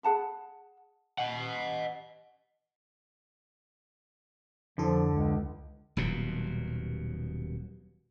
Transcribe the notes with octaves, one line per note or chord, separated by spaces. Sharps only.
G#4 F#5 A5 B5
D#5 F#5
F2 D3 E3 F3 A4
C#2
D#1 D#2 B2 F#3